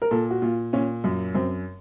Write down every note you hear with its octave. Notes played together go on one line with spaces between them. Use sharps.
A#4
A#2 A4
F#4
A#2 F4
A#2 C#4
F#2
F#2 C4